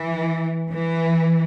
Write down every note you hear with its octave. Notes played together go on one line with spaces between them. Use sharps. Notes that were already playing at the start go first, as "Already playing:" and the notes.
Already playing: E3
E3